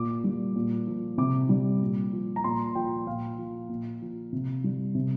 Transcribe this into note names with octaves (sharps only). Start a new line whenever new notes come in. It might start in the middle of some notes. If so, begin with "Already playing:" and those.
Already playing: A#2 D6
G3
A#2
F3
C3 D6
G3
A#2
F3
A#5
A#2 C6
F3 G5
A#2 F5
F3
A#2
F3
C3
G3
C3